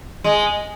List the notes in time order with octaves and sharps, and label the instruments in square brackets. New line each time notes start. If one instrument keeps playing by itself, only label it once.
[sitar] G#3